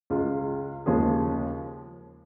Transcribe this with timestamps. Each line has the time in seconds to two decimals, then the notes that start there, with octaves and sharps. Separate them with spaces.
0.10 C#2 C#3 G#3 F4
0.86 D#2 C#3 F3 G#3 G#4